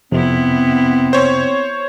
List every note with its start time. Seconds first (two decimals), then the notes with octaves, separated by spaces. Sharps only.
0.12 F2 C3 B3 C4 E4
1.13 C5 C#5